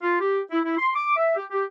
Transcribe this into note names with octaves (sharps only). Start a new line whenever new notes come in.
F4
G4
E4
E4
C6
D6
E5
G4
G4